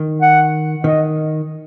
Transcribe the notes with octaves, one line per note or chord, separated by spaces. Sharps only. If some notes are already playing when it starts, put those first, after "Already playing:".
Already playing: D#3
F#5
D#3 D#5